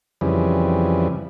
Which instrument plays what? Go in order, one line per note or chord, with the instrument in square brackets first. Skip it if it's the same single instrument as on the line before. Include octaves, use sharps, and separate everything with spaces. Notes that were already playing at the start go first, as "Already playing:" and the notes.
[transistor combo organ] F2 C#3 E3 G3